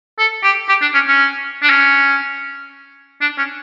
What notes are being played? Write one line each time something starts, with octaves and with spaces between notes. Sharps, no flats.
A4
G4
G4
D4
C#4
C#4
D4
C#4
D4
C#4